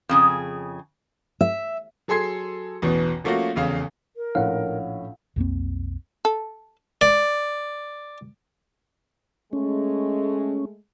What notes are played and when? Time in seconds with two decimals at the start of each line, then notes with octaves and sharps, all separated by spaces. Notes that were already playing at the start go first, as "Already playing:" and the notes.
0.09 F2 C#3 G#4
1.41 E5
2.08 F#3 G#4 A4 C6 G#6 C7
2.82 A1 E2 B2 E3
3.24 F3 A3 A#3 C#4 F4 F#4
3.56 F1 E2 C#3 F5
4.16 A#4
4.35 A#1 A2 C#4 F5 F#5
5.36 B1 F2 A#3 C4
6.25 A4
7.01 D5
9.53 G#3 A3 C#4